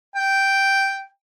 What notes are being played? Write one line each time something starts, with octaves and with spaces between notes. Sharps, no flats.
G5